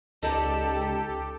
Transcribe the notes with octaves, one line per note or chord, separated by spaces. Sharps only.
C#2 D#4 G4 A4 D5 A5